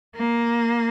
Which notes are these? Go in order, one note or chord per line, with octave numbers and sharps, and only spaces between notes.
A#3